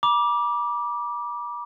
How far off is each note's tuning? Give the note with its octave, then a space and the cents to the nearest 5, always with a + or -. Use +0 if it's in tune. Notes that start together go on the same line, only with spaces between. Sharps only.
B5 -45 D6 +0